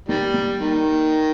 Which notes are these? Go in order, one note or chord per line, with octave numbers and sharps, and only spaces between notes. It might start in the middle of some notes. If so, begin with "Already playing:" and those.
D#3 G3 A#3
A#3
D#3